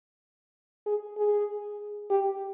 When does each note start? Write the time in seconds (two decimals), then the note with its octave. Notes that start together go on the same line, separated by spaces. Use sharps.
0.86 G#4
1.17 G#4
2.10 G4